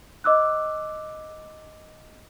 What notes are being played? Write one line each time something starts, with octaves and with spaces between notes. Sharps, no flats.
D#5 D6 E6 F#6